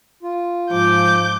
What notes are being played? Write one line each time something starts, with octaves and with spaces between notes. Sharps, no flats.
F4
G#2 F3 D6 G6